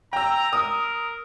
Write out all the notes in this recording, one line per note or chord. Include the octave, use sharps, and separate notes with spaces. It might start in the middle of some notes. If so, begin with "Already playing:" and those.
G5 A#5 E6
A#4 D#6